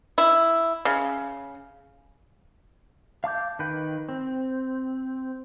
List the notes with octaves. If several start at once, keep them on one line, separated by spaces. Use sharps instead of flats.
E4
C#3
F5 A5 D6 G6
D#3 B4 G5
C4